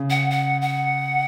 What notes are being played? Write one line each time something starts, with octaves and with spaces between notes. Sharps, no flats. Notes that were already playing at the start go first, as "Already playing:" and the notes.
Already playing: C#3
F#5
F#5
F#5